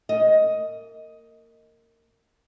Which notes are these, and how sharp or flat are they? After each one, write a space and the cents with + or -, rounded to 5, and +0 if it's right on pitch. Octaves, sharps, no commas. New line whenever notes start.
A#3 -25 D#5 +5